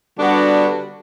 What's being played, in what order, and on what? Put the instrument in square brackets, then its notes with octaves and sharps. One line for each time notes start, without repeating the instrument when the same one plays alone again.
[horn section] D3 G3 B3 D4 F#4